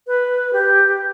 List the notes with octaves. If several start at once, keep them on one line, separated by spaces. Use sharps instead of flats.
B4
G4